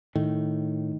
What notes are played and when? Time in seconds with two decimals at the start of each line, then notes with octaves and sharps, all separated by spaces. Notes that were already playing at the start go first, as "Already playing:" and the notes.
0.15 A2 D#3